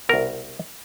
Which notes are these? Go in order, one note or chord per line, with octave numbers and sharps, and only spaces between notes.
C2 B2 A#4